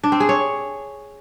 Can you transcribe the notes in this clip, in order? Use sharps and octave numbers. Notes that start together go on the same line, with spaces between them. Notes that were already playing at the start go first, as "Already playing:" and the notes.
D4
C4
G#4
C#5